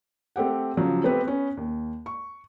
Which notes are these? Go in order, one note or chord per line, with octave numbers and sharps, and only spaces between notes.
A3 C4 G4 F#5
C#3 F3 F#3
A3 B3 C4 G4 B4
B3 C#4 B4
D#2
C#6